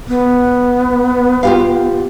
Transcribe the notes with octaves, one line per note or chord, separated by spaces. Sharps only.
B3
F4 G4 F5